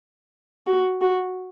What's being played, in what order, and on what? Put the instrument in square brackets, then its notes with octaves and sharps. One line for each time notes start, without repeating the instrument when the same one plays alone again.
[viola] F#4
F#4